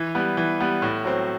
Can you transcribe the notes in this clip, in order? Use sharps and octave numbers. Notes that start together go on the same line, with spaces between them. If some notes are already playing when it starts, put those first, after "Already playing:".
Already playing: E3
G3 B3
E3
G3 B3
A2
F#3 C4